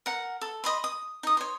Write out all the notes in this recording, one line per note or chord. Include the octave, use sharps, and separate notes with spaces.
A#4 F#5
A4
D#5 B5 C6
D#6
D#4 D#6
C#5 C6